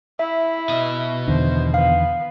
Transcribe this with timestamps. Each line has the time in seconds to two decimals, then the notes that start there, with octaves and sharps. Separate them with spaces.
0.19 E4 E5
0.70 B2 D#5
1.27 E2 D3 D#3 C5
1.74 B3 F5